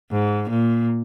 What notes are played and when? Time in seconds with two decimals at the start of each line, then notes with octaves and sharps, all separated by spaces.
0.11 G#2
0.50 A#2